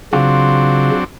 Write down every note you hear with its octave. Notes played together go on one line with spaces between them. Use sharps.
C#3 F#3 C4 D4 F4